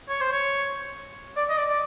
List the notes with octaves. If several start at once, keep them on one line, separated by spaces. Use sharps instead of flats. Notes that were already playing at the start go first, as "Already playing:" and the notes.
C#5
C5
C#5
D5
D#5
D5
D5